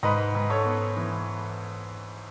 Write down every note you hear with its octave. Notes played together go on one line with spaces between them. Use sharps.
G#2 B4 D#5
G#2
A4 C#5
B3
E3